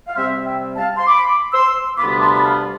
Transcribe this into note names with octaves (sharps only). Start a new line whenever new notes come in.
F5
C3 G3 C4 C5 E5
E5 G5
F5 A5
C6
B5 D6
C6 E6
D2 C3 G3 B3 F4 B5 D6
A5 C6
B5
F5 A5